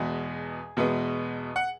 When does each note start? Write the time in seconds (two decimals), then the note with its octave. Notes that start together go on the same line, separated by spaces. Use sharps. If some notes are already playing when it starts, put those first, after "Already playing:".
Already playing: E2 B2 G#3 B3 G#4 G#5
0.77 E2 B2 G#3 B3
1.56 F#5